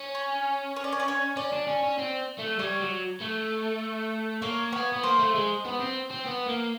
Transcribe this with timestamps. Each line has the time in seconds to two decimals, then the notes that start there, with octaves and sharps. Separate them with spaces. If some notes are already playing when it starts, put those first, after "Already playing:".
Already playing: C#4
0.15 C#5
0.76 C#5
0.84 D5
0.92 C#5
1.00 D5
1.08 C#5
1.36 C#4 D5
1.53 D4
1.67 C#4
1.83 C#4
1.98 C4
2.39 A3
2.59 G3 C#5
2.80 F#3
3.21 A3
4.42 A#3 C#5
4.73 B3 C#5
4.93 B3
5.03 A#3 C5
5.19 A3
5.35 G#3
5.65 B3
5.80 C4
6.10 C4
6.26 B3
6.46 A#3